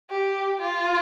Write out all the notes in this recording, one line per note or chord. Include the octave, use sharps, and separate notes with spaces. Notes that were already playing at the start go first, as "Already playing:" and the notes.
G4
F4